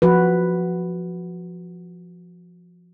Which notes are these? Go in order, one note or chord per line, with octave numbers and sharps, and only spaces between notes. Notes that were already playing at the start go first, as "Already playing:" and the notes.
F3 F#4 B4